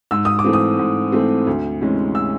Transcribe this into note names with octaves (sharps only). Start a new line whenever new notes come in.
G#2 E6
D#6
D6
E3 A3 C4
D#6
G#2
E3 A3 C4
D2
C3 E3 G#3 C#4
E6